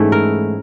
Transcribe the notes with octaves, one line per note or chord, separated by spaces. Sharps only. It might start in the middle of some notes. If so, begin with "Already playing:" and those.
Already playing: G#2 E3 A3 C#4 E4
A#4